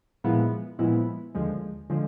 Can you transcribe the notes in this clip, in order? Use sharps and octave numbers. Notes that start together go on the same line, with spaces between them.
A#2 F3 G#3 B3 E4
A#2 F3 G#3 B3 E4
D#2 D3 F3 G#3
D3 F3 G#3